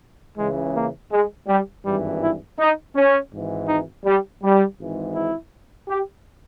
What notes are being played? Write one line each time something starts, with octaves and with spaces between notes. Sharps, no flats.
C#2 C#3 E3 G#3
A#3
G#3
G3
G#1 G2 E3 G3
E4
D#4
C#4
G#1 G#2 E3
D#4
G3
G3
G#1 G#2 E3
E4
G4